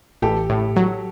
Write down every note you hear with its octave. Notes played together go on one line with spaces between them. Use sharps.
A1 G4 A4
A2
F#3